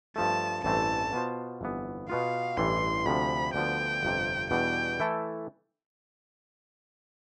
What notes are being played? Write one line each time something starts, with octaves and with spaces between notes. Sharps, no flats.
G2 F3 A3 A5
A1 G2 E3 A3 C4 A5
B2 B3 F4 C5
G1 F2 E3 B3
B2 B3 F4 F5
A1 G2 E3 G3 C6
D2 C3 F3 B5
D2 D3 F3 B3 G5
G1 F2 C3
E2 B2 G3 D4 G5
E3 A3 E4 A4